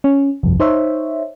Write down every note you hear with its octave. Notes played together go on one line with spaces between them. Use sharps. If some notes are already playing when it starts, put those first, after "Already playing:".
C#4
G1 C2 F2
D#4 C5 C#5 E5